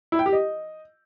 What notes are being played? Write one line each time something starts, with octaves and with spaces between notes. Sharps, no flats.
E4
G5
G4
D#5